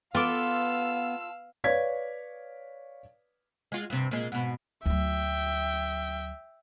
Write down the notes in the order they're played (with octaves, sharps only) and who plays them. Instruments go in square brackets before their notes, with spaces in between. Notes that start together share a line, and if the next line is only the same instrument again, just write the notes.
[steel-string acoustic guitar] B3 [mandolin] F4 A4 D6 [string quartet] F5 E6
[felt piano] B4 C#5 D5 F5 G#6 B6
[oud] G#3 F4
G2 C3
A#2 G#3
G#2 B2
[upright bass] D2 F#3 [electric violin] E5 G5